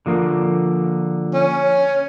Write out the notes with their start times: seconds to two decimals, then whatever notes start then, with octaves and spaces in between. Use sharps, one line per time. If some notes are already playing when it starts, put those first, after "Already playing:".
0.06 D3 F3 A#3
1.34 C#4